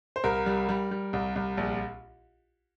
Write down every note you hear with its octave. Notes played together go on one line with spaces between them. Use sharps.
C5
C2 A#4
G3
G3
G3
C2
C2
A#1